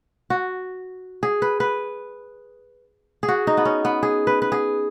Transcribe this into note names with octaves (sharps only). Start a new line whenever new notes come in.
F#4
G#4
B4
B4
G#4
F#4
D#4
B3
C#4
B3
G#4
B4
B4
G#4